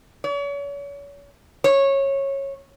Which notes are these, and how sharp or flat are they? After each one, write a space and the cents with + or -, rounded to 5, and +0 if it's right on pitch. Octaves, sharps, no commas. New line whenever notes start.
C#5 +40
C#5 -15